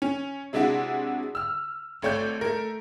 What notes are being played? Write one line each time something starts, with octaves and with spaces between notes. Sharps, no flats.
C#4
C3 G#3 D4 E4 F#4
E6 F6
G#1 A3 C#5 D5 G6
A3 A#4